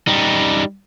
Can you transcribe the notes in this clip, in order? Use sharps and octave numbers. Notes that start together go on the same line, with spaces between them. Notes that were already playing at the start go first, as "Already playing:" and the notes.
G3 D#4